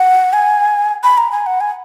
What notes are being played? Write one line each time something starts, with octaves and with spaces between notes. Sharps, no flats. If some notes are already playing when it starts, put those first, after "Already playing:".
Already playing: F#5
G#5
B5
A#5
G#5
F#5
G#5